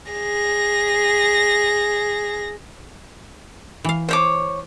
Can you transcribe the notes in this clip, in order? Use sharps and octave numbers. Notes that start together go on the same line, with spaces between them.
G#4 A#6
E3 F5
C5 C#5 D6